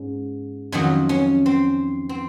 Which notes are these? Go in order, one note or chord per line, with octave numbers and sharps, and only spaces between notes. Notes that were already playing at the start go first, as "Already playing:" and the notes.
Already playing: G#2 C#4
F2 D#3 F#3 C#4
C#4
C4
C4